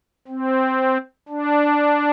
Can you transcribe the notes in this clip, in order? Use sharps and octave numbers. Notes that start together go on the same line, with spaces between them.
C4
D4